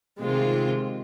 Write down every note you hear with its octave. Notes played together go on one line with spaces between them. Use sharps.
C3 D#3 G#3 C4 F4